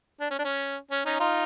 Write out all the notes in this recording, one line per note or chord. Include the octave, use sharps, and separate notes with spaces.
D4
C#4
D4
C#4
C#4
C#4 D#4
D#4 F4